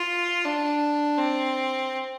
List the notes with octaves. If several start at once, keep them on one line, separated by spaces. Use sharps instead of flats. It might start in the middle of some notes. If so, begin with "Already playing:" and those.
Already playing: F4
D4
C4